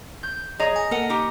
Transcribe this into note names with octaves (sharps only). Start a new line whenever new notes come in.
G6
G#4 C#5 D#5 A#5
G#5
A#3 A4 A#4 F#5
D#4 G4